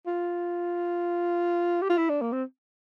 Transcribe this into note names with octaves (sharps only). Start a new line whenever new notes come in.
F4
G4
F4
E4
D4
A#3
C4